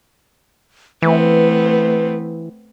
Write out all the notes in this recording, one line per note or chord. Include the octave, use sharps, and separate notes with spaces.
E3 A3 B3 C4 B4